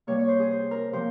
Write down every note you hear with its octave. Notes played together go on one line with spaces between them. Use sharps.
C3 G3 A#3 C#5
C#5
C5
G#4
C5
A#4
C3 F3 A#3 C5